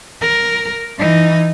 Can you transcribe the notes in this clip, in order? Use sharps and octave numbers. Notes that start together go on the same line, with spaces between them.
A#4
E3 D#4